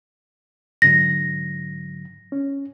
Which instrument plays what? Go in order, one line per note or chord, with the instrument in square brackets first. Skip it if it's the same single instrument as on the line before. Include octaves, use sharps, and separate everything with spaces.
[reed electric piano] G#2 D3 F#3 [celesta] A#6
[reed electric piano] C#4